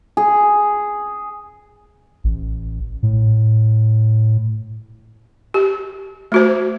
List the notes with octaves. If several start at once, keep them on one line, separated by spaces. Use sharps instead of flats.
G#4
A1
A2
G4
A3 F#4 C5